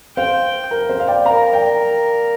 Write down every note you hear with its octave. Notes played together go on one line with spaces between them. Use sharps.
C5 F5 G5
A#4
C5
F5
D5 G5
A#4 F5 A#5
D5 G5